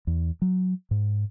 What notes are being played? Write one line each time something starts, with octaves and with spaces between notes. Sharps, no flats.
E2
F#3
G#2